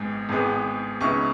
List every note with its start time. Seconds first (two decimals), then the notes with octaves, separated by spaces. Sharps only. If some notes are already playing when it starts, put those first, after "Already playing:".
Already playing: G#1 G#2 G#3 B3
0.29 G#1 G#2 G#3 B3
1.01 C#2 C#3 B3 D#4 C#6